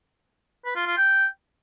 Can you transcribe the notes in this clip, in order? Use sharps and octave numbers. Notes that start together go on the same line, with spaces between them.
B4
F4
F4
G5